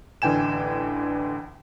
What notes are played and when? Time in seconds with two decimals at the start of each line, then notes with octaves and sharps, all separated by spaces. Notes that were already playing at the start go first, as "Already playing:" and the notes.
0.22 A1 D3 E3 G5 G#5 E7